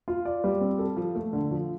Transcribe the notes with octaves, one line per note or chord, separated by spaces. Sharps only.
F4
D5
G3
C4
A4
F3
A3
D3
F3